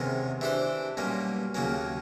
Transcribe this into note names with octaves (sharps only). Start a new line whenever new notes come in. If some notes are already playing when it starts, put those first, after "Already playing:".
Already playing: E2 C3 D#3 G#3 C#4
E3 A3 D4 G4 C5
B1 A#2 G3 A#3 C#4
D#2 C#3 F#3 A#3 C#4